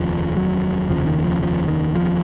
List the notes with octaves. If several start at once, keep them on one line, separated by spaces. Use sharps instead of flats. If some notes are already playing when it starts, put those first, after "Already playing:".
Already playing: F1 D#2 C#3 F3
F#3
F1 D#2 C#3 F3
D#3
F3
F3
D#3
F3